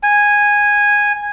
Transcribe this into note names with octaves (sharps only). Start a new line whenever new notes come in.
G#5